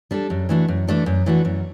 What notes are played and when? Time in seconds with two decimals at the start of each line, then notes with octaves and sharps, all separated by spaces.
0.11 G3 D4 A4
0.30 F#2
0.49 E3 A3 D4 F#4
0.68 F#2
0.87 E3 A3 D4 F#4
1.06 F#2
1.26 E3 A3 D4 F#4
1.45 F#2